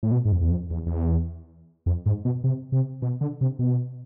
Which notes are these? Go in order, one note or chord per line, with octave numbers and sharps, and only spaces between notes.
A2
B2
G#2
F2
E2
F2
E2
E2
F2
G#2
B2
C3
C3
B2
D3
C3
B2